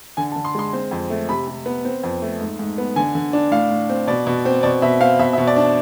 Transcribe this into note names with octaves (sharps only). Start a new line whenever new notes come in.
D3 G#5
A5
D3
C6
G#3 C6
C4
F2
A3
C3 B5
C3
B3
C4
F2
A3
G#2
G#2
B3
D3 G#5
D3
D4
A2 F5
A2
C4
B2 D5
B2
C4
B2 D5
B2 E5
C4 F5
B2 E5
E5
B2
D5
D4